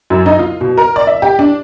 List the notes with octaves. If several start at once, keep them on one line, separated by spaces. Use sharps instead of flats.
F#2
D#4
F4
B2
A#4
D5
E5
G4
D4